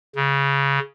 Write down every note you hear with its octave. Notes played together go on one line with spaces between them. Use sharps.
C#3